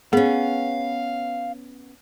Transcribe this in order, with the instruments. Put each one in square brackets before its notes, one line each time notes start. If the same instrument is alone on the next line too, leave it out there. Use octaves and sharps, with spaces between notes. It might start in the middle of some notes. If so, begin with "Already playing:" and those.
[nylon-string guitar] B3 C#4 [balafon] G#4 [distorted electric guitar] F5